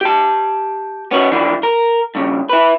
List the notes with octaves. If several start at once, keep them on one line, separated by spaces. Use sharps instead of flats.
G4 A5
B3 C#4 F#4
E3 F3 D4
A#4
G2 C#3
E4 B4